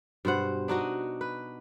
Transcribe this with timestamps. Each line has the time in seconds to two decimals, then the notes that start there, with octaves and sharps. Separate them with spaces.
0.25 G2 B2 C5 F#5
0.68 D4 D#4 F#4 D#5
1.21 B4